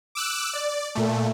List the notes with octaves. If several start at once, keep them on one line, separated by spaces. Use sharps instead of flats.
D6 E6 F#6
D5
A#2 A3